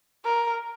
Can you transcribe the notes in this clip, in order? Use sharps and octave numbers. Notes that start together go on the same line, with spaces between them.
A#4